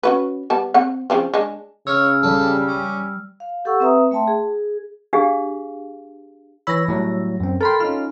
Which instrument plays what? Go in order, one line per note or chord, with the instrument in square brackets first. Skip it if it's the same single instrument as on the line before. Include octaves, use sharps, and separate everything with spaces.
[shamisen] C#4 F#4 B4
G3 B3 A5
C4 F#5
C#3 F3 C4
G#3 D4
[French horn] C#3 [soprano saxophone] C#5 [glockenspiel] E6 F6
[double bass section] G3 [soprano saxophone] A4
[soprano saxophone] C#4
[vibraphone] F5
G4 A4 F#5 C#6 E6
C4 B4 E5 A#5 D#6
A3 E5 G5 A5 C6
G#4
[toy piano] D4 G4 G#4 F5
[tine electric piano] E3 C#5 B5 [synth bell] E6 A#6
[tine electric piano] A2 F#3 G3
F#2 C4
[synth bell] A4 B5 C6 [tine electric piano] A#4 G5
[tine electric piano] C#4 D#4 F4 [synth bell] F6